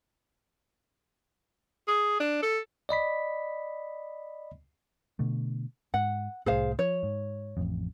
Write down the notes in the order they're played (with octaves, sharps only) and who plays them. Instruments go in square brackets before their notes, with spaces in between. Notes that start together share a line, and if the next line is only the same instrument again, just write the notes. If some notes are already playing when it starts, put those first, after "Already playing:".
[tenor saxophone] G#4
D4
A4
[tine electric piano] D5 D#5 B5 B6
[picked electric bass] B2 D3 A3
[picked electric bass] G#2 [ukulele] F#5
[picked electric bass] C2 A2 [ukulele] G#4 C5 F5
[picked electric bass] F3 [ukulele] C#5
[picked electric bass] G#2
A1 F2